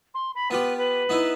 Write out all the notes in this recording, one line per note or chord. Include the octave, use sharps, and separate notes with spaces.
C6
B5
B3 F4 G4 B4
B4
B3 D#4 E4